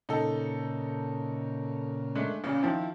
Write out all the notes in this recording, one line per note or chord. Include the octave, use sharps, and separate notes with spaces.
A#2 C#3 D#4 A4
G#3 A3 D4
A1 A#2 C#3
D#3 F3 C4 E4